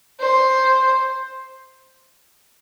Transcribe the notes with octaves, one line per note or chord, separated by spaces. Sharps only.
C5